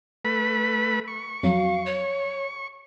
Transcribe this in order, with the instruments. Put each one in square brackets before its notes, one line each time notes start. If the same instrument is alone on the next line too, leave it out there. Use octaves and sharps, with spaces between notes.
[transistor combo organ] A3 B4 B5
C#6
[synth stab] F2 F#3 [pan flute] F5
[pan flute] C#5